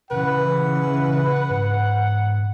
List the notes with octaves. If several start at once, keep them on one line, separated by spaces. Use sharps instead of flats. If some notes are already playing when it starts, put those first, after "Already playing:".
C#3 E3 B4 F#5
G#2